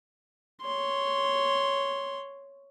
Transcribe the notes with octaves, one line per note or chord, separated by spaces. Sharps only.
C#5 C6